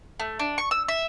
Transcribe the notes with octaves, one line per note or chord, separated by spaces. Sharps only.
A3
D4
C#6
E6
E5